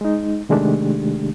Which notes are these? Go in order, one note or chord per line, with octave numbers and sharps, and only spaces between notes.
G#3 D#4
C3 D#3 G#3 A3 D4 G4